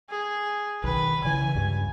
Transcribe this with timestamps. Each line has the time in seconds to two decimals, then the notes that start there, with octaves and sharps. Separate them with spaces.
0.10 G#4
0.84 B1 D#3 B4
1.25 C#3 E3 G#5
1.55 C#2 G2